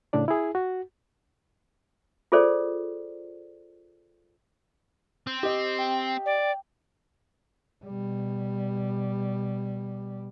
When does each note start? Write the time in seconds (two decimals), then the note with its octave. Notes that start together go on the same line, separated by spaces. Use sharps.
0.13 A2 C#3 D4 D5
0.28 E4 G#4
0.55 F#4
2.32 F4 G#4 A4 C5 D5
5.27 C4
5.43 G4 D#5
5.79 G5
6.26 D5
7.86 B2 G3